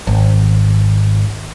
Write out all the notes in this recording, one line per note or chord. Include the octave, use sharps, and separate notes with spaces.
G#1